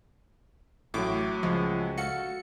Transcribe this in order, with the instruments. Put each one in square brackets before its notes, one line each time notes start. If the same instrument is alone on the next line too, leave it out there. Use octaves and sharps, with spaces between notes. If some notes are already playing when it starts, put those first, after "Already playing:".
[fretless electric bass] A1 [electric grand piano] A2 F#3 [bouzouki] E4 [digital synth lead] D6
[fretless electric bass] C#2 [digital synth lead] F3 [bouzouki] G#3
[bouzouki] F#4 A4 F5 [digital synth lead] C#7